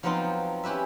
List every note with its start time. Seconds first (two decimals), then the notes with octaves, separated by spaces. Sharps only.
0.03 F3 F#3 B3 C4 D#4 F4
0.64 C#4 E4 G4 B4 E5